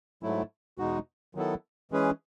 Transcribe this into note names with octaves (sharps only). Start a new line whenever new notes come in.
G#2 F#3 A3 E4
E2 B2 G#3 D#4 F#4
D#3 F#3 B3 E4 A4
E3 G#3 C#4 G#4 B4